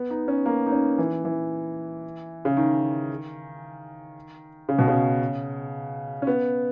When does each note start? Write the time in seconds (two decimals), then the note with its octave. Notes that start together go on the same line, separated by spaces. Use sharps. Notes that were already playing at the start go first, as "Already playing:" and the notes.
Already playing: B3
0.10 D#4
0.28 C#4
0.46 A#3
0.67 D#4
0.72 C#4
0.99 E3
1.25 E3
2.45 C#3
2.57 D#3
4.69 C#3
4.79 B2
4.88 C#3
6.22 C#4
6.27 B3